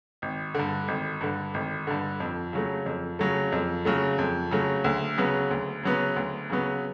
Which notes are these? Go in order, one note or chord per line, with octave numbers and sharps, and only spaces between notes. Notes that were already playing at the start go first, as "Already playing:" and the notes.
G#1
G2 D3
G#1
G2 D3
G#1
G2 D3
F2
C#3 F#3 A3
F2
C#3 F#3 A3
F2
C#3 F#3 A3
F2
C#3 F#3 A3
D2
C#3 F#3 B3
D2
C#3 F#3 B3
D2
C#3 F#3 B3